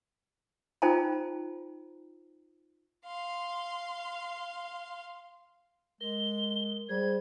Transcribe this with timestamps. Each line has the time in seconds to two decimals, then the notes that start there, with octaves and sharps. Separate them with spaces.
0.82 D#4 F4 C5 G5 A5 A#5
3.05 F5 C6
6.01 G#3 A#4 G7
6.89 G3 G#4 C5 G#6